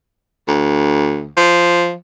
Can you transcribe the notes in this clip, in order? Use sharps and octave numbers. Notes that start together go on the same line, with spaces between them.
D2
F3